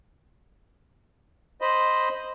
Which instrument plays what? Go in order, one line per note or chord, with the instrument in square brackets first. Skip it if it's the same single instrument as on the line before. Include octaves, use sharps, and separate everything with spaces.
[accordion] C5 D#5 B5